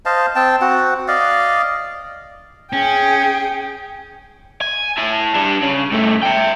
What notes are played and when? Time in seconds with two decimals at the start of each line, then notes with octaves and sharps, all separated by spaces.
0.05 C5 D#5 F5 A5
0.36 C4 G5 A5
0.61 C4 F#4 F#5
1.08 D5 D#5 F5
2.73 C#4 G#4 G5
4.61 G#5
4.97 E4 A5
5.34 G3 D4
5.62 C#3
5.93 G2 A3
6.23 E5 G5